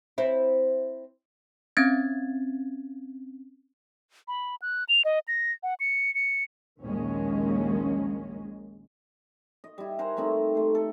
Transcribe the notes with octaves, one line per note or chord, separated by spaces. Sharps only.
C4 E4
C4 C#4 G#6 A6
B5
F#6
F7
D#5
A#6
F#5
C#7
C#7
A#1 D#2 D#3 G#3 A#3 C#4
D#5
G3 E4
A#4 C5 F#5 G#5
G3 A3 C4 D#4
A3 C6
A4